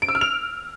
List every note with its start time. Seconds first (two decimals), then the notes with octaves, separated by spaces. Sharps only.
0.02 D7
0.08 E6
0.15 F6
0.21 F7